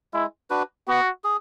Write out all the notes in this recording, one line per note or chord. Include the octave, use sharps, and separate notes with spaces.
G#3 E4
D4 F#4 B4
B3 F#4
G#4